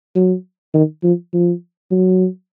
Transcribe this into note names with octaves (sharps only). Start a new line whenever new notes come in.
F#3
D#3
F3
F3
F#3